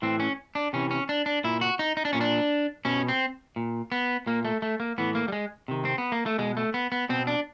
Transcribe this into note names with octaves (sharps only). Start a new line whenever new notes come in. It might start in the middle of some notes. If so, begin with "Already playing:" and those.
A2 E3 C4
C#4
D4
C3 E3 C#4
C#4
D4
D4
A#2 E4
F#4
D#4
D#4
D4
A#2 C#4
D4
B2 C#4
C4
A#2
B3
A#2 A#3
A3
A3
A#3
A2 E3 B3
A#3
G3
G#3
C3 D#3
C4
B3
A#3
A3
B2 G#3
A3
B3
B3
B2 C4
D4